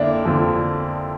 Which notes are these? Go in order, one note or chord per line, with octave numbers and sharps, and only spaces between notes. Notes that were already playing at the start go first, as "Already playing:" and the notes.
Already playing: F2 D3 A#3 D4 E4
F2 D3 F3